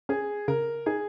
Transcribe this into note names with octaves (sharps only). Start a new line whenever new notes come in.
C#4 G#4
C#3 A#4
D#4 G#4